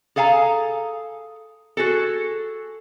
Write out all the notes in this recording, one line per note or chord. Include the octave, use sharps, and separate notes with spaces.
G#4 A4 F5 G#5 A#5
F#4 G#4 A4